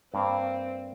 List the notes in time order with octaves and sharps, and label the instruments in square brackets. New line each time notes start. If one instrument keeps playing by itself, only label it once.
[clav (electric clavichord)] G2 A#3 F5 [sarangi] C4